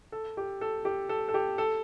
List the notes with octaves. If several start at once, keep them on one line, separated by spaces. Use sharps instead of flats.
A4
G4
A4
G4
A4
A4
G4
A4